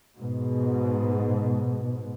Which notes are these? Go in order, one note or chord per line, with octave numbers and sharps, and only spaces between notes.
G#2 B2